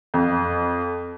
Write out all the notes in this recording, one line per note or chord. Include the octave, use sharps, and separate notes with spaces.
F2